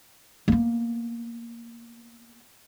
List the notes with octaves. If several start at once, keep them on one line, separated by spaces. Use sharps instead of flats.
A#3 B3